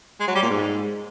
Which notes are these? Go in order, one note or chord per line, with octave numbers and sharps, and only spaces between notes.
G#3
F#3
G3
A#2
G#2